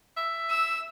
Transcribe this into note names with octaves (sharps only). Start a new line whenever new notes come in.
E5
E6